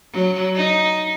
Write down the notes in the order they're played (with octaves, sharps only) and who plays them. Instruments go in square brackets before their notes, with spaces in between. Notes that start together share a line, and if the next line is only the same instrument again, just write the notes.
[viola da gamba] F#3
D#4